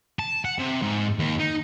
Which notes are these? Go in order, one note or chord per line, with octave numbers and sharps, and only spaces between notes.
A5
F#5
C3
G#2
D#2
D#4